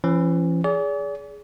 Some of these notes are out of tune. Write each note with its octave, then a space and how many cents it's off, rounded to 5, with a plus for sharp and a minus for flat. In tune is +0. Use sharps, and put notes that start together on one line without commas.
E3 +45 C#4 -20
G#4 +0 D5 -40